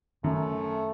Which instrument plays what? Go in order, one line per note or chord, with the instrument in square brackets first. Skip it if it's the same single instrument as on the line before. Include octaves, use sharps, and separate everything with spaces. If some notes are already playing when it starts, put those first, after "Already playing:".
[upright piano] F#2 [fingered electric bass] D#3 [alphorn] A3